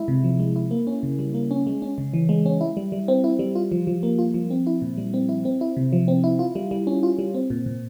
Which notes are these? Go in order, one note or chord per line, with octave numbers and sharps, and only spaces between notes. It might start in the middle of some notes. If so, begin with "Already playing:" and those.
Already playing: G#3 E4
C3
F3
G#3
E4
A#3
C#4
C#3
G3
A#3
C#4
G#3
C#4
C#3
E3
G#3
C#4
E4
G3
G3
C4
E4
G3
F4
F3
F3
A#3
F4
F3
C4
E4
A#2
G3
C4
E4
C4
E4
C3
F3
C4
E4
F4
G3
G3
C#4
F4
G3
C4
A#2
A#2